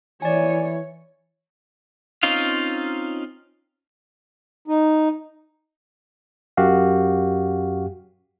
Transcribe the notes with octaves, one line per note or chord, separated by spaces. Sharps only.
E3 C#5 D5 G#5
C4 C#4 D#4 F4 F5
D#4
F#2 F#4 G4 F5